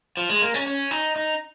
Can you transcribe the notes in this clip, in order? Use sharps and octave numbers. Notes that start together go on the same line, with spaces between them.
F3
G#3
A#3
C#4
C#4
D#4
D#4